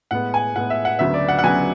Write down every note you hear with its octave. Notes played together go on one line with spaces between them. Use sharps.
A2 G#3 B3 F#5
G#5
A2 G#3 B3 F#5
E5
F#5
D2 C#3 F#3 B3 E5
D5
F#5
F#5
D2 C#3 F#3 B3 G#5